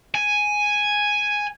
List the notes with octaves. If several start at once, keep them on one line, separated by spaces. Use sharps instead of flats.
G#5